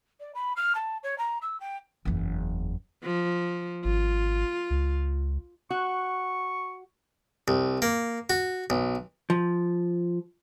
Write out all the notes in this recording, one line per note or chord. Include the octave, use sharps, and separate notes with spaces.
D5
B5
F6
A5
C#5
A#5
E6
G5
F#1 E2
F3
G#1 F4
C#2
F#4 C#6
C2
A#3
F#4
B1
F3